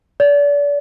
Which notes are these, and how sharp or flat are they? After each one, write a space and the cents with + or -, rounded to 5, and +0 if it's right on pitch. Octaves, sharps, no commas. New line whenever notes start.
D5 -35